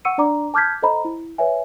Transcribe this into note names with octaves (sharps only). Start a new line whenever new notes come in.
F#5 C#6 E6 C#7 D#7
D4 D5 A#5 D6
A5 D6 F6 G6 G#6 B6
A4 C5 D#5 A#5 B5
E4
B4 C#5 E5 G#5